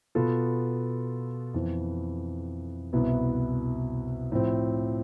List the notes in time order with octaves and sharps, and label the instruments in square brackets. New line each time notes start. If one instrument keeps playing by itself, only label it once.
[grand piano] B2 B3 F4 A4
F2 E3 B3
C2 B2 B3 E4
A2 F3 C4